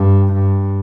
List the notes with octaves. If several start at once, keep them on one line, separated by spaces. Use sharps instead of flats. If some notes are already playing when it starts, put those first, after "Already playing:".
Already playing: G2
G2